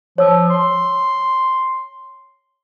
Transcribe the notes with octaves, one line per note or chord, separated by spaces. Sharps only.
F3 C#5 E6
C6